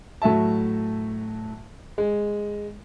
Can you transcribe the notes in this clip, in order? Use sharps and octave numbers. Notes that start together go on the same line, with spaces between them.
A2 F#3 E5 A5
G#3